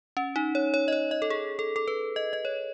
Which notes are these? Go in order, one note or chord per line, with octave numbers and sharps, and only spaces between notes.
C#4
D#4
C#5
C#5
D#5
C#5
D#5
A4
G#4
A4
A4
B4
D#5
D#5
C#5